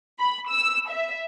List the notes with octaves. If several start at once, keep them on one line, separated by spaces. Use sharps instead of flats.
B5
E6
E5